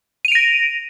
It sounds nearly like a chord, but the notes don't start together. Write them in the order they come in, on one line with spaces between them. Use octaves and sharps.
D#7 F7 D7 A#6